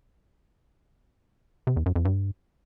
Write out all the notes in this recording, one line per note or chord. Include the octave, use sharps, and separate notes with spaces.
C3
E2
F#2
F2
G2